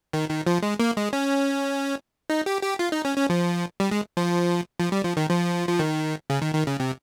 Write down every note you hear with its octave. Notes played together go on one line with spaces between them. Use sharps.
D#3
D#3
F3
G#3
A#3
G#3
C#4
D#4
G4
G4
F4
D#4
C#4
C#4
F3
G3
G#3
F3
F3
G3
F3
D#3
F3
F3
D#3
C#3
D#3
D#3
C#3
C3